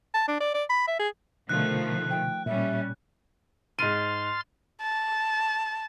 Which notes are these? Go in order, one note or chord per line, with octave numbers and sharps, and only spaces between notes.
A5
D4
D5
D5
B5
E5
G#4
B2 D3 D#3 F3 A3 F#6
G5
A#2 G3 C#4 E5
G#2 C6 F6 A6 D#7
A5